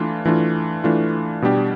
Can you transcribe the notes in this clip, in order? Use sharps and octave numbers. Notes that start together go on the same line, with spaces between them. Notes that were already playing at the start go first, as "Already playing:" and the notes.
Already playing: E3 A3 D4 F4
E3 A3 D4 F4
E3 A3 D4 F4
B2 G3 D4 G4